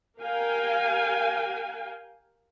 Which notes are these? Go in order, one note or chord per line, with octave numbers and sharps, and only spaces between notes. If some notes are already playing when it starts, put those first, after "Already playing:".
G4 A#4 F5 G5 G#5